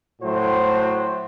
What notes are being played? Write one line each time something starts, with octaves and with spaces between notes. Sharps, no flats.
A2 F#3 A3 F#4 C5